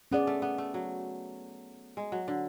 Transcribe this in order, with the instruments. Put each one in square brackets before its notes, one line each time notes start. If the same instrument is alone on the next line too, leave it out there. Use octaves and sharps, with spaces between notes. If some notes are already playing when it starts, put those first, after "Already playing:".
[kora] B3 [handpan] C#4 G#4 D5
[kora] A3
B3
A3
F#3
G#3
F#3
D3